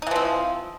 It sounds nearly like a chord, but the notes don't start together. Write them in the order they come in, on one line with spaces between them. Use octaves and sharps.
D#4 E3 F3 C4